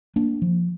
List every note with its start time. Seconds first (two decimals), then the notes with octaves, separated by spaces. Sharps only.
0.16 A#3 D4
0.42 F3